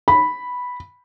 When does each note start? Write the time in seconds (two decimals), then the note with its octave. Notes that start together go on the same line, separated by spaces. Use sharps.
0.08 B5